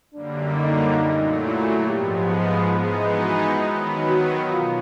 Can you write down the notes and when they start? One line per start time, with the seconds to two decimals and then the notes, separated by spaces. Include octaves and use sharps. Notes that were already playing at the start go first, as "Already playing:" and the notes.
0.14 F#2 D3 G3 A#3 D4
0.57 D#4
1.02 A#2 F#3 A3
1.45 E4
1.88 G#2 F3 G#3 B3 G4
2.32 G#4
2.76 E3 G#3 B3 D#4 G#4
3.20 F#4
3.63 D#3 F#3 B3
4.07 F#4
4.51 B2 F4